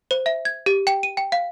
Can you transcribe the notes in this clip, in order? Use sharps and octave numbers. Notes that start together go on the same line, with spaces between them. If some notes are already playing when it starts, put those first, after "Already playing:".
C5
E5
G#6
G4
G5
D#7
G5
F5